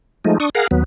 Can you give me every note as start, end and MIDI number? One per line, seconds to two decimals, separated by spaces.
0.25 0.38 53
0.25 0.38 56
0.25 0.38 57
0.25 0.38 63
0.40 0.50 62
0.40 0.50 85
0.40 0.50 87
0.55 0.67 68
0.55 0.67 70
0.55 0.67 77
0.55 0.67 78
0.71 0.84 39
0.71 0.84 54
0.71 0.84 59